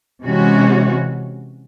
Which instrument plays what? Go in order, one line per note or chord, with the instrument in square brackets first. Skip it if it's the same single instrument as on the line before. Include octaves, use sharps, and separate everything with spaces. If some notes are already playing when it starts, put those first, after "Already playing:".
[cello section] C3 E3 G#3 C#4 F#4